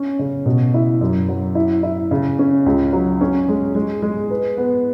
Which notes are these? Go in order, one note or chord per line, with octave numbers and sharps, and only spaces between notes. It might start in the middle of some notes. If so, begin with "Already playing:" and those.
Already playing: C#4
C#3
B2
E4
F#2
F#3
E4
E4
C#3
C#4
C#2
F#3
C#4
G#3
G#3
G#3
B4
B3